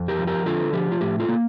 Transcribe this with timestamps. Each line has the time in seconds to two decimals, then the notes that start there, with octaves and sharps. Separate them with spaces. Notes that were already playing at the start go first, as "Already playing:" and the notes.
Already playing: F2
0.08 G4 A#4
0.18 F3
0.27 G4 A#4
0.46 D3 F4 A4
0.73 F3 G4
0.92 F4
1.01 A2 G4
1.20 F4 A4
1.29 A#3